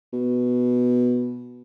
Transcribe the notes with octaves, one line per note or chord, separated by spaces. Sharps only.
B2